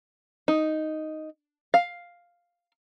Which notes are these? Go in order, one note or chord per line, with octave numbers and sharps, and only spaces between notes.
D#4
F5